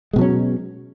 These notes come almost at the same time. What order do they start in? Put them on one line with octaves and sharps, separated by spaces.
G#3 B2 F#3 C#4